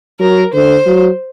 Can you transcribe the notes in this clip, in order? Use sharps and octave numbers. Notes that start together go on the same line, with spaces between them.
F#3 A#4
D3 C5
F#3